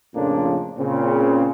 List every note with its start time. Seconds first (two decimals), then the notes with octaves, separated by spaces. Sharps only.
0.14 F2 A2 C#3 F3 A#3 D4
0.78 A#2 C#3 C4